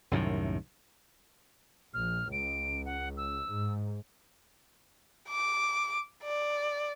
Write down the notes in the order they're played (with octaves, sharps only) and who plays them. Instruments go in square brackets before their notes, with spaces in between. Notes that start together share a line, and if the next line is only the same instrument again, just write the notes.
[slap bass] C2 F#2 A2 D#3
[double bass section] A#1 [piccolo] F6
[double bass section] C#2 [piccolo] D7
[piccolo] F#5
E6
[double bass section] G#2
[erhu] D6
D5